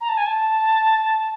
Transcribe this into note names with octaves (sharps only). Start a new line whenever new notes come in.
A#5
A5
G#5
A5